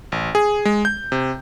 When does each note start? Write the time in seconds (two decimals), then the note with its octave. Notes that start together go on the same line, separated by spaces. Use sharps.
0.12 A1
0.35 G#4
0.65 G#3
0.85 G6
1.12 C3